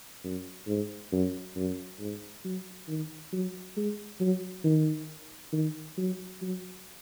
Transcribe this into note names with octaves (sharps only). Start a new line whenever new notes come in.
F#2
G#2
F#2
F#2
G#2
F#3
D#3
F#3
G#3
F#3
D#3
D#3
F#3
F#3